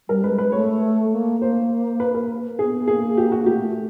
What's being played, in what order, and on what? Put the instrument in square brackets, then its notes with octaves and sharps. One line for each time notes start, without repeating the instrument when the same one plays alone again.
[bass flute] G3 [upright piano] A#4
[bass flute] G#3 [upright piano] B4
[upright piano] B4
[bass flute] A3 [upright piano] C#5
[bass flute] A#3
[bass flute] A#3 [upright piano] C5
[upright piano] B4
A#4
[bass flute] B3 [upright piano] G#4
[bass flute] A#3 [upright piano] G#4
[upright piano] G4
F#4
[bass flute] A#3
[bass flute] A3 [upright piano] G4